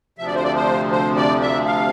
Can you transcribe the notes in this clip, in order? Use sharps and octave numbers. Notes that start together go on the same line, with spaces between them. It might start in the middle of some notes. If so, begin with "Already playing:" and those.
D2 C3 F3 E5
D5
C5
D5
C5
C5
D5
E5
F5